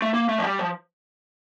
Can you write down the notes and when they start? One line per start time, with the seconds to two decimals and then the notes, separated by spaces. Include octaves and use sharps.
0.02 A3
0.14 A#3
0.29 A3
0.38 F3
0.44 G3
0.59 F3